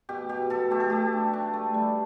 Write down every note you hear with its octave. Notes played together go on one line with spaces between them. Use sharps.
B2 G4
B2 G4
B2 A4
A3 G4
A4
A3 G4
D4
D4
A3
G3